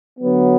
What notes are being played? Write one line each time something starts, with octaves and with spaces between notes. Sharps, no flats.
D3 F#3 B3